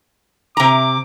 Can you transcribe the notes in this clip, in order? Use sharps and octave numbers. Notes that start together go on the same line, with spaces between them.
C3 A#5 D6